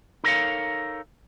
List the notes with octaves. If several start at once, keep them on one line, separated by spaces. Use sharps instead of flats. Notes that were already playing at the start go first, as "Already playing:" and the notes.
D#4 A4 A#4 C5 C#5 F5